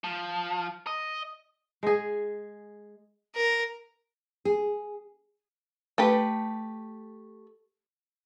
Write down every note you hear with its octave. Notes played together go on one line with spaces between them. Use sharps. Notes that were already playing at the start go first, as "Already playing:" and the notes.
F3
D#5
G#3 G#4
A#4
G#4
A3 G4 B4